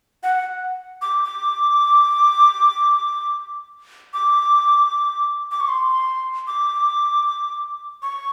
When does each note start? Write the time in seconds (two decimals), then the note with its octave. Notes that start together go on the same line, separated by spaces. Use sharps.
0.23 F#5
1.02 D6
1.25 D6
4.13 D6
5.51 D6
5.60 C#6
5.69 C6
6.47 D6
8.02 C#6